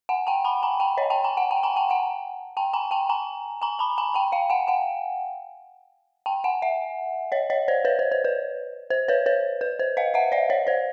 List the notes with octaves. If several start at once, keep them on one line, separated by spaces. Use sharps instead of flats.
F#5 G#5
G5 A5
A5 B5
G#5 A#5
G5 A5
C#5 D#5
G5 A5
G#5 A#5
F#5 G#5
G5 A5
G#5 A#5
G5 A5
F#5 G#5
G5 A5
G#5 A#5
G5 A5
G#5 A#5
G#5 A#5
A5 B5
G#5 A#5
G5 A5
F5 G5
F#5 G#5
F#5 G#5
G5 A5
F#5 G#5
E5 F#5
C#5 D#5
C#5 D#5
C5 D5
B4 C#5
C5
C5
B4
C5
B4 C#5
B4 C#5
B4
C5
D#5 F5
E5 F#5
D5 E5
C#5 D#5
C5 D5